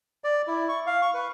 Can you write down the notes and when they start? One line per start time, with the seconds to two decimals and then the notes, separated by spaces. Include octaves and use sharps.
0.24 D5
0.47 E4
0.69 C#6
0.87 F5
1.02 C#6
1.14 B4